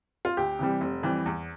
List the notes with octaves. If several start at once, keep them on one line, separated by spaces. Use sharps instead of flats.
F4
D2 G4
C3 E3 G3
F1
F2 E3 G3
E2